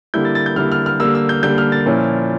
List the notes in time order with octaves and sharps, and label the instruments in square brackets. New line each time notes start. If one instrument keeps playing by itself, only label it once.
[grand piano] D3 G3 A#3 E4 G6
A6
A6
G6
D3 G3 A#3 E4 F6
F6
F6
D3 G3 A#3 E6
E6
G6
D3 G3 A#3 G6
F6
A6
A#2 F3 C#4 E4